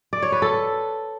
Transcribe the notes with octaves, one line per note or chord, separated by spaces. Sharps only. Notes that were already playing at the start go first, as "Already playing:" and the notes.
D5
C#5
B4
A4